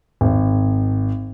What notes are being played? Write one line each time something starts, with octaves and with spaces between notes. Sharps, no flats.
G#1